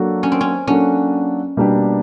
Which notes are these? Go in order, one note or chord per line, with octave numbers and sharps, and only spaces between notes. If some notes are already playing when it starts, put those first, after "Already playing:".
Already playing: F#3 A#3 D4 F#4 A4
C#4
C4
C#4
F#3 A#3 C#4 D4 F#4 A4
B2 G3 A#3 D4 G4